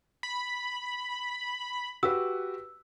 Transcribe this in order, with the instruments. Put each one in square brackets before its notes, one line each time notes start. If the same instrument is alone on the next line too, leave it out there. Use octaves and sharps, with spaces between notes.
[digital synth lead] B5
[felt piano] F#4 G4 B4 [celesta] E6